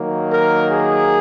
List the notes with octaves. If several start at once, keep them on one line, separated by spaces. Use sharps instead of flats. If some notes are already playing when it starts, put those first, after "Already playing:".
Already playing: D#3 F#3 A#3
A#4
G#4